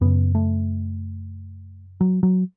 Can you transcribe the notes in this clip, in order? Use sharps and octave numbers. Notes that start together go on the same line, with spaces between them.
F#2 C#3 B3
A3
F#3
F#3